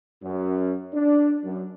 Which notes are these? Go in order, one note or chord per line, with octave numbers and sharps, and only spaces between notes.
F#2
D4
F#2